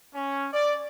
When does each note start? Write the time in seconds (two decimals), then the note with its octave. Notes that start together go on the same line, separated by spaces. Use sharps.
0.14 C#4
0.53 D5